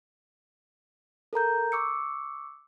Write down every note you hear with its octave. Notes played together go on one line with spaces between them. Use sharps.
A4 A#4 A#5 G6
C#6 D6 E6 C#7